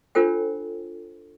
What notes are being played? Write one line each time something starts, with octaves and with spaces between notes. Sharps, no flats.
D4 F4 A4 C5 G5